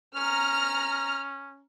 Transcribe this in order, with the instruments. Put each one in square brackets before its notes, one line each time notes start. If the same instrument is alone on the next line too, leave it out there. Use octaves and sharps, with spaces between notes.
[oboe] C#4 [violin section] A#5 F6